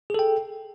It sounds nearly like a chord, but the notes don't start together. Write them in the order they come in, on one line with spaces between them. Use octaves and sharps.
G#4 A4 G5